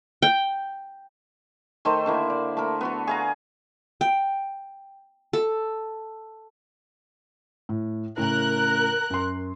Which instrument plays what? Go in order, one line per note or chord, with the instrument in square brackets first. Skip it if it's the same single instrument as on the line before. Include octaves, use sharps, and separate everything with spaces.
[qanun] G5
[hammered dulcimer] D#3 A3 D#4 C5
D3 A#3 E4
D5
A3 A4 A#4
B3 F#4 A4
G#4 F5 A#5
[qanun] G5
A4
[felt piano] A2
[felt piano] A2 C#3 [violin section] A#4 F#6
[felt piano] F#2 C6